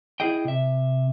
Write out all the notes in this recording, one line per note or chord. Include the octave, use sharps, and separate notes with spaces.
E4 G#4 D#5 G5
C3 E5